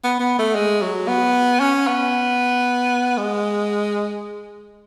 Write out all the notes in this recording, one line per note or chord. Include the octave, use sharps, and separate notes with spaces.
B3
B3
A3
G#3
F#3
B3
C#4
B3
G#3